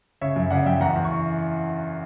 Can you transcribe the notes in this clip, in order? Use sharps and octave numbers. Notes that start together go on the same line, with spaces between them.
C#3 C#5 E5
F#2
C#3 D5 F#5
F#2 E5 G5
E2 F#5 A#5
E2
C#6